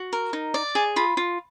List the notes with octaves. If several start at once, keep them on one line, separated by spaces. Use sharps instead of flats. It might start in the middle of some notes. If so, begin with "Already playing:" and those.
Already playing: F#4
A#4
D#4
D5
G#4
F4 B5
F4